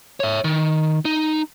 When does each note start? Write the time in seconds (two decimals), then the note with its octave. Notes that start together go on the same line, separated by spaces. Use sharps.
0.20 C#5 E5
0.44 D#3
1.05 D#4